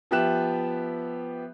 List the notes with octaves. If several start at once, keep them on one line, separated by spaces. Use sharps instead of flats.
F3 B3 G4 E5 F#6 E7